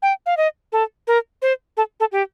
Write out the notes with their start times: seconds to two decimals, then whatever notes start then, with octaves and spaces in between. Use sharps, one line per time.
0.02 G5
0.26 F5
0.37 D#5
0.72 A4
1.07 A#4
1.42 C5
1.77 A4
2.00 A4
2.12 G4